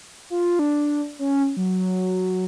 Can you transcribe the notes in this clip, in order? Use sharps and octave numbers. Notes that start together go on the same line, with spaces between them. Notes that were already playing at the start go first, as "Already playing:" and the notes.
F4
D4
C#4
F#3